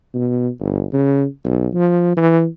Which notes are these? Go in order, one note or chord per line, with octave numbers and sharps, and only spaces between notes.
B2
G1
C#3
B1
F3
E3